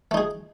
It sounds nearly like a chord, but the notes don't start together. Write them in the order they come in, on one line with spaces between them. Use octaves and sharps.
A3 D#4 G#4